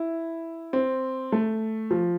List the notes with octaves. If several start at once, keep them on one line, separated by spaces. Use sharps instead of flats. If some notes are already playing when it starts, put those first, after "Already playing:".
Already playing: E4
C4
A3
F3